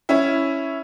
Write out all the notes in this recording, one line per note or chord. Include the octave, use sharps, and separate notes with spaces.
C#4 E4